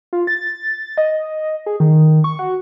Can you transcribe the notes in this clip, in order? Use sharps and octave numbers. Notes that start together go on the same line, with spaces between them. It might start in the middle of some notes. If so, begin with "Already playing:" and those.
F4
A6
D#5
G#4
D#3
C#6
F#4